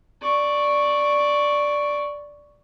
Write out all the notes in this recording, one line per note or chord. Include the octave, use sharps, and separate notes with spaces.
D5 C#6